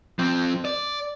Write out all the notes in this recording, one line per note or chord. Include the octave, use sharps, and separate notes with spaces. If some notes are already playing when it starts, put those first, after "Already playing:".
F3 C4
D5